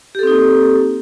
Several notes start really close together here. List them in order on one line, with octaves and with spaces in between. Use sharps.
G4 A4 C4 D#4 A#3